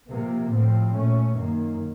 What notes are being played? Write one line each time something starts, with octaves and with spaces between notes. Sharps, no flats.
C3 F3 A#3
A2 F3 C4
A#2 A3 C#4
F#2 D#3 A#3